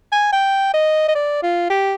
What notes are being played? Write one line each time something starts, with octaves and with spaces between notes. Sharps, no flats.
G#5
G5
D#5
D#5
D5
F4
G4